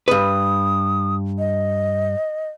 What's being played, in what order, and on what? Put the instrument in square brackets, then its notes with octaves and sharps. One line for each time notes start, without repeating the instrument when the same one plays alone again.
[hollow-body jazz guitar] G2 B4 [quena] D#6
[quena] D#5